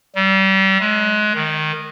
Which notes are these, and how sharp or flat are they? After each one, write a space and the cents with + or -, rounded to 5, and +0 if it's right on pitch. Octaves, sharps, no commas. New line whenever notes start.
G3 -30
G#3 +30
D#3 -10